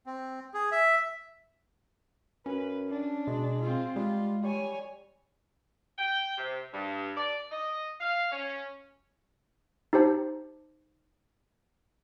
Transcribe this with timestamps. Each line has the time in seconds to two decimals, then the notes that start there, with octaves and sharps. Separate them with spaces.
0.06 C4
0.54 G#4
0.72 E5
2.46 F#2 C#4 B4
2.89 D4
3.27 B2 G#3
3.60 C4 F4
3.96 G3 G#3 F4
4.43 G3 C#5 G#5
5.98 G5
6.38 C3
6.74 G2
7.17 D5
7.51 D#5
8.00 F5
8.31 C#4
9.93 D#4 G4 C5 A5